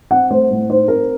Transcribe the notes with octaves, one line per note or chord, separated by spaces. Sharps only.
C4 F#5
A3 C5
A2
D#4 C5
C4 A#4